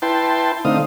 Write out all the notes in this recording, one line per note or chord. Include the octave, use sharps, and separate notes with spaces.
E4 B4 G5 A5 C6
D3 A3 C4 D#4 F5 D#6